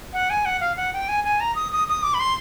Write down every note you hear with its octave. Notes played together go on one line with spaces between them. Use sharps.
F#5
G#5
F#5
F5
F#5
G5
G#5
G#5
A#5
D#6
D#6
D#6
D6
B5
C6